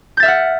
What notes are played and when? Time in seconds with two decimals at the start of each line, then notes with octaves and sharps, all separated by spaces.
0.17 G6
0.20 A6
0.23 E5
0.25 F6
0.28 F#5